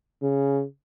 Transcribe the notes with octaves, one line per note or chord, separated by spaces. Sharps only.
C#3